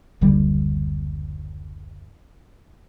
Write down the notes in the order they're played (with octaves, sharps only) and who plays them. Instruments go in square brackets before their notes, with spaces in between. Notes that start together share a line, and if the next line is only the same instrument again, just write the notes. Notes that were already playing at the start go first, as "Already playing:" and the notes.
[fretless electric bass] F#1 D2 D3 G3